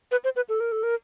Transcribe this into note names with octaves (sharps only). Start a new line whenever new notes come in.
B4
C5
B4
A4
A#4
A4
A#4